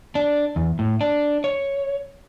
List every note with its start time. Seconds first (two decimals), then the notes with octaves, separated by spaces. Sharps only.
0.15 D4
0.56 E2
0.79 A2
1.01 D4
1.44 C#5